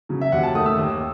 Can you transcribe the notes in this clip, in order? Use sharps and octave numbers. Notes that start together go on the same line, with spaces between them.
C#3 F#3
E5
D#2 F#5
A5
D#3 A3 D#6
E6
D#2